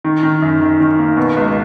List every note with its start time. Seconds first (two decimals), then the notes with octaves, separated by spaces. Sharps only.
0.04 D#3
0.23 D#3
0.42 F#2
0.61 D#3
0.80 D#3
0.99 A#3
1.17 B2
1.37 C#2